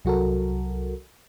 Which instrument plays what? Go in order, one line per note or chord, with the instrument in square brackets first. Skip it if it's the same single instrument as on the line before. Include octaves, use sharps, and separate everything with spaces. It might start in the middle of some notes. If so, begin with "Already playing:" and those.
[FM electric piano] C2 F#3 F#4 A4 A#4